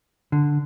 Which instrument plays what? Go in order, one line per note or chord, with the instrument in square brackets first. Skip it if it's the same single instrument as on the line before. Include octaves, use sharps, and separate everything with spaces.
[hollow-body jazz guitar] D3